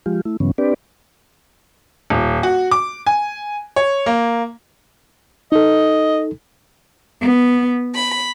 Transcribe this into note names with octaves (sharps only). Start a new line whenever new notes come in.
F3 G#3 F4 G4
A3 E4
G2 C#3 E3 F#3 B3 C#4
C4 D4 G4 B4 D5
D#1
F#4
D6
G#5
C#5
A#3
D#4 A4 D#5
B3
B5